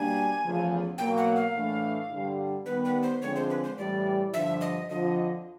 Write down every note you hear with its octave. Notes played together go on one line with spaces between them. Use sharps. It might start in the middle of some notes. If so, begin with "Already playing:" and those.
Already playing: B2 G3 A#3 D4 G#5
E2 C#3 F3 A3
B2 F#3 A#3 G5
F#5
F5
A2 E3 A3 D4
G2 D3 G3
D#3 G3 B3 B4
B4
C5
D3 F3 G#3 C4 C#5
C5
B4
C5
A2 E3 G3 D5
G2 D3 F3 E5
D#5
F2 D3 F3 D#5